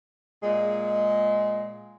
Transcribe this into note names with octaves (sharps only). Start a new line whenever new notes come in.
A#2 G#3